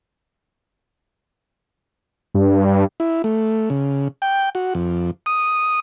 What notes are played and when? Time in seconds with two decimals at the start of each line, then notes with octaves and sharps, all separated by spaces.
2.35 G2
3.00 E4
3.24 A3
3.70 C#3
4.22 G5
4.55 F#4
4.75 F2
5.26 D#6